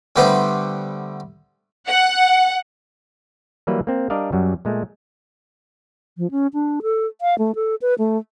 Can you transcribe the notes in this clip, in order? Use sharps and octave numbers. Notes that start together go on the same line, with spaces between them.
D3 G3 A3 B3 B4 C5
F#5
E3 F#3 G3 A#3 B4 E5
A#3 C4
G3 D4 A#4 D5 D#5 F5
F#2 F#3 G3
A#2 G#3 A3
F3
C#4
D4
A4
F5
A3
A4
B4
A3